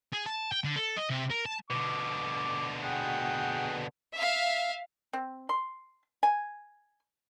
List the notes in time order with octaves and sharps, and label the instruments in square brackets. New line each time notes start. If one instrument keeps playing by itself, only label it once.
[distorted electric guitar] G#4
A5
G5
D3
A4
D#5
C3
A#4
A5
[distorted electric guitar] B2 D3 [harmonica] D6
[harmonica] G#4 F#5 G5
[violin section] E5 F5
[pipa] C4
C6
G#5